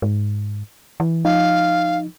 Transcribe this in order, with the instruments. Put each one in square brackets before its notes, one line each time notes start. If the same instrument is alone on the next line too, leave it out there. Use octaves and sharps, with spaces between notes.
[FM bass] G#2
E3
[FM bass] F3 [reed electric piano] D#4 [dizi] F5